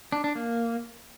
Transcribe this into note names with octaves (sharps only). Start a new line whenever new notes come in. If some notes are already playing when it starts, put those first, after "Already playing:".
D4
D4
A#3